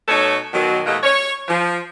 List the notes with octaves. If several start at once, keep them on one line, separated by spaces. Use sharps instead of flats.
B2 A3 D#4 A4 C#5
B2 D#3 F#3
B2 E3 A3 A#3 G4 D#5
C#5
F3